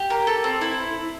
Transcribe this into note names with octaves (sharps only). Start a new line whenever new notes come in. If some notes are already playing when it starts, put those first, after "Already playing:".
Already playing: G4
A#3
A4
C4
E4